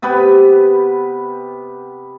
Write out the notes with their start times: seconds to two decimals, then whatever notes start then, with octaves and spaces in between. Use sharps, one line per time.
0.02 C3 B3 G4 B4